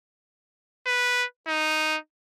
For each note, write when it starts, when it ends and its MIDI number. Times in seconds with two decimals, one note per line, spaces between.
0.87 1.25 71
1.48 1.97 63